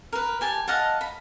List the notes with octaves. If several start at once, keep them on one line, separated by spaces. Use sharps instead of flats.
A#4 B4
G4 G#5 A5
D#5 F5 F#5 A5
B5